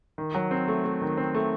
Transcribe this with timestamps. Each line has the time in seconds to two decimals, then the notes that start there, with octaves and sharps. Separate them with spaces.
0.18 D#3
0.35 F#3
0.51 C4
0.68 A3
0.84 A3
1.02 D#3
1.17 C4
1.35 A3